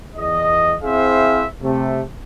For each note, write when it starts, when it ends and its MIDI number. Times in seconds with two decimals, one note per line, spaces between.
0.15 0.75 40
0.15 0.75 75
0.83 1.45 60
0.83 1.45 64
0.83 1.45 68
0.83 1.45 72
0.83 1.45 76
0.83 1.45 77
1.62 2.02 48
1.62 2.02 57